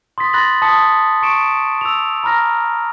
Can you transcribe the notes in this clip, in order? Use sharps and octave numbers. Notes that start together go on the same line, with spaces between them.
C6 D#6 A6 B6
B5 C6 F#6 A6 A#6 F#7
A5 C6 D#6 A6 B6 C#7
C#6 C#7 D7 E7
E6 F7
A#5 B5 F6 A#6